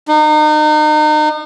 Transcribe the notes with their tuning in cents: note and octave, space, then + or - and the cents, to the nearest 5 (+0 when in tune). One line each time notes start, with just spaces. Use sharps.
D#4 -35